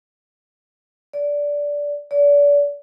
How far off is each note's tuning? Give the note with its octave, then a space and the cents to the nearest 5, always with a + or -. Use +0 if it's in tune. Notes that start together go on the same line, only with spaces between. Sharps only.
D5 -15
D5 -35